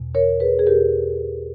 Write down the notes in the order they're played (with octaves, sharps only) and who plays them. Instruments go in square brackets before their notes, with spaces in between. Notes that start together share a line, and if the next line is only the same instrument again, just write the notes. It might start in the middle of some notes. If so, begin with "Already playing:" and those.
Already playing: [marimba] E2 B2
A#4 C#5
G#4 B4
G#4
E2 B2 G4 A#4